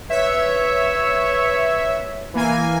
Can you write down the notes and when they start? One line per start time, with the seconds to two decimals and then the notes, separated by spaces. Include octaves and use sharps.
0.10 B4 C#5 E5
2.33 E3 A#3 G#5